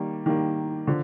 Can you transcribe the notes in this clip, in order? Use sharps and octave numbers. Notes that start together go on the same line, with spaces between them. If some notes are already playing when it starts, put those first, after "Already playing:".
Already playing: D#3 G3 A#3
D#3 G3 A#3
D3 F3